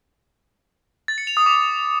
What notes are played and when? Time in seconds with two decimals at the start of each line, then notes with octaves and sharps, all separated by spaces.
1.08 A6
1.18 C#7
1.27 F7
1.37 D#6
1.46 D6